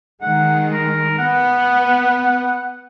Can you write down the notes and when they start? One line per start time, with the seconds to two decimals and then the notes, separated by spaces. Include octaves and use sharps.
0.22 D#3 G#3 F#5
0.74 A#4
1.19 B3 F#5